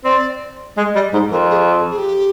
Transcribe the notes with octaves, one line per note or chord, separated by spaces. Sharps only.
C4 D5
G#3 D#5
G3 D#5
G#2 C5
F2 A#4
G#4
G#4
G4